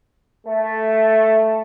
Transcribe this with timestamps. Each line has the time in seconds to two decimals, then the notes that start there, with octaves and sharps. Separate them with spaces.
0.46 A3